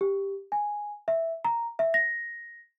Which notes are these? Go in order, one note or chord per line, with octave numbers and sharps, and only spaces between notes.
G4
G#5
E5
A#5
E5
A#6